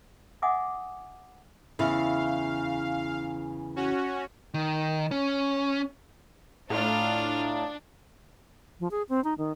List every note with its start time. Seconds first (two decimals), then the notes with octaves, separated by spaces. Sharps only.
0.42 D#5 E5 F#5 G#5 D6 D#6
1.79 E2 C#3 E4 F5
3.76 C#4 F#4
4.54 D#3
5.11 C#4
6.70 A2 D4 F4 F5 A#5 D#6 F6
8.80 F3
8.91 G#4
9.09 C4
9.24 D#4
9.38 D#3